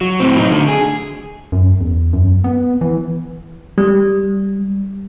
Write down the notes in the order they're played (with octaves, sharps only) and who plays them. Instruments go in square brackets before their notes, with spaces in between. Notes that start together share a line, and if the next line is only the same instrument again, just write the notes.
[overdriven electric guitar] F#3
A2 C4
F#3 D#4
D2 D3
G#4
[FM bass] F#2
E2
F#2
B3
E3
[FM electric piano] G3